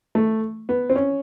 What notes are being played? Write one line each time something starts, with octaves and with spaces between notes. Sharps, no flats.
A3
B3
C4
C#4